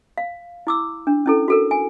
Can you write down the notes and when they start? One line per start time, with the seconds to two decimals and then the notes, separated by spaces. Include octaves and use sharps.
0.18 F5
0.67 E4 D6 E6
1.07 D4
1.26 C#4 E4 A4
1.48 F#4 A4 A#4
1.71 G#5